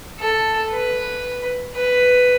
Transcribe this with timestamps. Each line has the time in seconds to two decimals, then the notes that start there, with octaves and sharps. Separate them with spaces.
0.20 A4
0.71 B4
1.75 B4